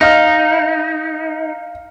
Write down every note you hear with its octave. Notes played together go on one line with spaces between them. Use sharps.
D#4 D#5 F5 F6